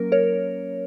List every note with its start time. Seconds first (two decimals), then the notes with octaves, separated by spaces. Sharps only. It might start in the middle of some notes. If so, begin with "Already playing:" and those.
Already playing: F#3 A#3 C#4 A#4
0.12 A#4 C#5